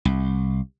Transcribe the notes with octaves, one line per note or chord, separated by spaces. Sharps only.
C2